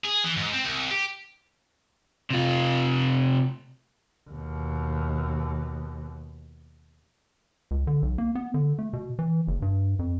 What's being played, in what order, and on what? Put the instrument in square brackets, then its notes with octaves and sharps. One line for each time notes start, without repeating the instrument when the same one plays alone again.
[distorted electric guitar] G#4
E3
G#2
C4
C2
G4
[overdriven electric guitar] C3 F4
[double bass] D#2 B2
[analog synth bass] C#2
D3
B1
A#3
B3
D3
A3
B2
E3
F#1
G2
F2